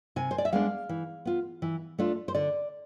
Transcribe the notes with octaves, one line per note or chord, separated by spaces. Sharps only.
C3 G#5
C5
D5
E5
G#3 B3 D4 F5
E3
B3 F4
E3
A3 D4 F4
C5
D3 D5